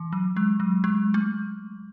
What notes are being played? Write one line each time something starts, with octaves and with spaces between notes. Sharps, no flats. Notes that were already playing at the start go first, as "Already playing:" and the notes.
Already playing: E3
F#3
G#3
F#3
G#3
A3